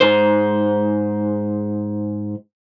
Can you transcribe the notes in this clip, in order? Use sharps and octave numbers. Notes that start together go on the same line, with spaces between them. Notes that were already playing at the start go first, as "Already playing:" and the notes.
G#2 C5